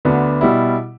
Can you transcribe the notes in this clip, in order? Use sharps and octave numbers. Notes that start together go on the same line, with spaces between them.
D2 D3 B3 D4
B2 G3 E4